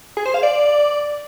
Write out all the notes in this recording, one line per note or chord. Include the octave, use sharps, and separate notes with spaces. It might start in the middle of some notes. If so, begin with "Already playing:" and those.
G#4
C5
F5
D5